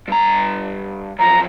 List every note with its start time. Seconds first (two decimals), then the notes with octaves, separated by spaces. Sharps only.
0.08 G2 A#5
1.19 F#2 F3 A#5